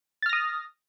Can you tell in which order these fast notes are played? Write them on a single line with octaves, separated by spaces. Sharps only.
A6 F6 A#6 D#6